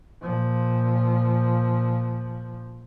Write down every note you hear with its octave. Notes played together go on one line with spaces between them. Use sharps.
A#2 F3